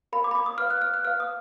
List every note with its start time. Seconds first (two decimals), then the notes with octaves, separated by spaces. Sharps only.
0.13 A#4 F5 B5
0.24 D6
0.31 B5
0.35 D6
0.46 D#6
0.58 B4 F5 F6
0.70 F#6
0.82 F6
0.94 F#6
1.05 B4 F5 F6
1.20 D#6